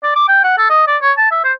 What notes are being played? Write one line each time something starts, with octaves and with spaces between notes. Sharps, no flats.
D5
D6
G5
F#5
A4
D#5
D5
C#5
A5
E5
C5